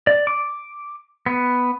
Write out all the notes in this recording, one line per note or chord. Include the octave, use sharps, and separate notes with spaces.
D5
D6
B3